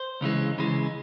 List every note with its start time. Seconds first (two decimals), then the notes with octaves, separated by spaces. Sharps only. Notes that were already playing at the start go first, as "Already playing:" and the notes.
Already playing: C5
0.21 C#2 C#3 E3 G#3
0.57 C#2 C#3 E3 G#3